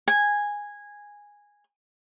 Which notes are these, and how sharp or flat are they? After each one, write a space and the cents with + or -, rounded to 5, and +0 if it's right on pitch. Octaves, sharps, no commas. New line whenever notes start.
G#5 -10